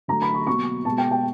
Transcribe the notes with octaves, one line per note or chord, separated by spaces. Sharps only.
D3 F#3 A3 A#5
B5
C#6
B2 F#3 A#3 C#6
B2 G#3 A5
G5
G5